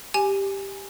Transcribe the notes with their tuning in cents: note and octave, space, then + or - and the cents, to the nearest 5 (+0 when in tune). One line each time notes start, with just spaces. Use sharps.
G4 +0 G#5 +0